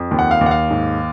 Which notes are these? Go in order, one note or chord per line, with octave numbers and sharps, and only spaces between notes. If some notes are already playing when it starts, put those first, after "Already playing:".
Already playing: F2
D#2
F#5
F5
D#2
F#5
F5
G#2